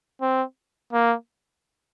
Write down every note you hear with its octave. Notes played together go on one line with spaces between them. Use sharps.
C4
A#3